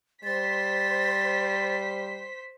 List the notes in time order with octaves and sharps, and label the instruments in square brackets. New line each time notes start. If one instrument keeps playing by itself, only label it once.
[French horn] G3 [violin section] C5 B6 [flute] A6